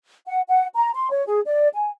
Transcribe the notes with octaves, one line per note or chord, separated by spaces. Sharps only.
F#5
F#5
A#5
C6
C#5
G#4
D5
G#5